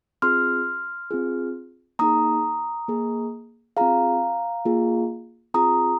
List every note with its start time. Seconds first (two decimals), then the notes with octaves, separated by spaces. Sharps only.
0.22 C4 F4 G#4 C6 F6
1.11 C4 F4 G#4
1.99 A#3 D#4 G#4 A#5 D#6
2.88 A#3 G#4
3.77 C4 F4 G#4 F5 A#5
4.65 A#3 F4 G#4
5.54 C4 F4 G#4 A#5 D#6